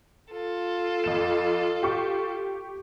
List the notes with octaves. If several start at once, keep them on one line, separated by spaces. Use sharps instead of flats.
F4 A4
F2 E7
G4 C#6